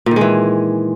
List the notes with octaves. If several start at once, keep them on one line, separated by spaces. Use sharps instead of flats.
A#2 D#3 E3 G#3